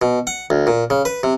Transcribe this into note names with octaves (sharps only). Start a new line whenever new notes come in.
B2
F#5
D2
A#2
C#3
B4
C3